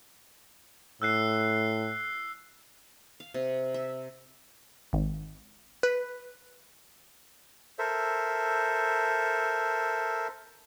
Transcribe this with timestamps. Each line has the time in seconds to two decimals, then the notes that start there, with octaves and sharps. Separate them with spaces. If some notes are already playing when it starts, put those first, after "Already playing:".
1.02 A2 E6 F#6 C7
3.20 F5
3.34 C3
3.74 E5
4.93 G#1
5.83 B4
7.79 A4 A#4 C5 E5